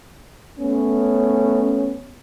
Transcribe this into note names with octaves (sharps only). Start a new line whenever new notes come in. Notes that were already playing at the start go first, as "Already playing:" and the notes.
A3 B3 C#4